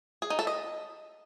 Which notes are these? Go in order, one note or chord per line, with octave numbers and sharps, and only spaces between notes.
G#4
D#4
A4
D#5